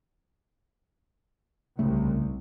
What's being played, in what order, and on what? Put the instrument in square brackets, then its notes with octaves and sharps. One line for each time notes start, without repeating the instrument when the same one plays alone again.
[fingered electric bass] D1 C#3 A3 [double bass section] C2